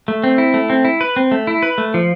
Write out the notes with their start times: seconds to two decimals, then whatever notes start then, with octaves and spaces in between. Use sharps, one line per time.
0.08 A3
0.24 C4
0.38 E4
0.54 A3
0.70 C4
0.85 E4
1.01 B4
1.16 C4
1.31 A3
1.47 E4
1.63 B4
1.78 A3
1.94 F3